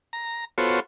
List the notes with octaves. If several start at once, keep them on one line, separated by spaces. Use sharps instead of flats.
A#5
B3 F4 F#4 A4 C5 C#5